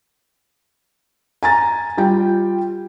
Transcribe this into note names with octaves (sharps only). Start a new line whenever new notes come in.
G#5 A#5 A6
G3 F4 G5